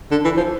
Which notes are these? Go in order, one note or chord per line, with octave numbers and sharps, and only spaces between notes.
D3
E3
F3